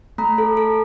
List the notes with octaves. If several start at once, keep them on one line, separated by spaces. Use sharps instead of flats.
A3 A#5
A4
A4